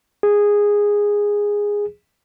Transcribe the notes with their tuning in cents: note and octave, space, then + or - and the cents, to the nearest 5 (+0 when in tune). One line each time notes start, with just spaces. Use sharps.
G#4 -10